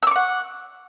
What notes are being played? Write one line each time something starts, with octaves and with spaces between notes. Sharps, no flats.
F#5 C#6 D6 E6